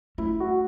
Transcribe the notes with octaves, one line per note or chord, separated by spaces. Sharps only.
A3 E4
F#4